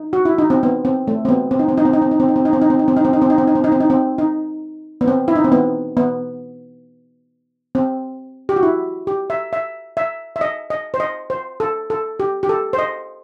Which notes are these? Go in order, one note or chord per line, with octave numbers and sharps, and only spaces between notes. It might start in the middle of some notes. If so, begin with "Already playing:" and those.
Already playing: D#4
F#4
E4
D#4
C4
B3
C4
A3
C4
B3
C4
D#4
C4
D#4
C4
D#4
C4
D#4
C4
D#4
C4
D#4
C4
D#4
C4
D#4
C4
D#4
C4
D#4
C4
D#4
C4
D#4
C4
D#4
C4
D#4
C4
D#4
B3
C4
E4
D#4
C4
B3
B3
C4
G4
F#4
E4
G4
E5
E5
E5
E5
D#5
D#5
C5
D#5
C5
A4
A4
G4
G4
A4
C5
D#5